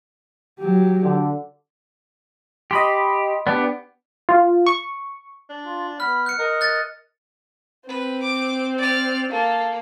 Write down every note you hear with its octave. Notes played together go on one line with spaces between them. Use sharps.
F#3 G4
D3
G4 D#5 B5 C6
B3 D4 G4
F4
C#6
D4
F4
B3 B5 F6
F#6 C#7
A#4 D#5
F#6 A6
C4 B4
D6
D5 F6
A#3 A4 F5